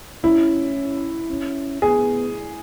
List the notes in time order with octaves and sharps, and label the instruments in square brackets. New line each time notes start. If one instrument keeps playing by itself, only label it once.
[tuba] C#4 [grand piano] E4
[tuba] C#4
[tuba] B3 [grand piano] G#4